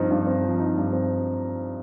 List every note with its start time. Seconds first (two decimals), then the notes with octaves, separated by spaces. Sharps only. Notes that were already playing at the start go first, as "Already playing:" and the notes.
Already playing: G2 F3 C4 D#4
0.11 G2
0.27 C4
0.44 F3
0.60 D#4
0.77 G2
0.93 C4